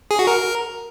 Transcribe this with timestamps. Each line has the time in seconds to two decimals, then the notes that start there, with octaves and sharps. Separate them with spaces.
0.11 G#4
0.19 F#4
0.27 A#4